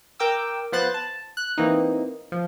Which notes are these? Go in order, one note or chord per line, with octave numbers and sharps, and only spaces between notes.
A#4 G5 D6 E6
F3 B3 C5 F#6 A6
A5
F#6
E3 A#3 C4 D#4
F3